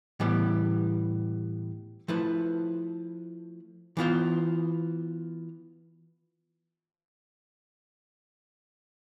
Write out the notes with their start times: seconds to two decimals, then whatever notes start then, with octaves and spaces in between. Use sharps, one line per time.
0.20 A2 E3 G3 B3
2.08 F3 A3 E4 B4
3.97 E3 B3 F4 C5